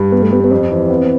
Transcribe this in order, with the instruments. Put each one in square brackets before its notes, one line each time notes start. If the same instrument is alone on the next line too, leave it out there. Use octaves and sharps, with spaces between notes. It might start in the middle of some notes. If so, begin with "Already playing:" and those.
Already playing: [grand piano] G2
[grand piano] G3 [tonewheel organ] B3
[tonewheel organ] A3
[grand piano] G3 [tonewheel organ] B3
[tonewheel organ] B3
[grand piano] F2 [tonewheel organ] C4
[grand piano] E3
B3